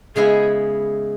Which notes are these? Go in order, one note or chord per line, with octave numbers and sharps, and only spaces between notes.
C#3 G#3 B3 E4 G#4